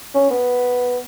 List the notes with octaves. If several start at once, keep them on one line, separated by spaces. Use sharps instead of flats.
C#4
B3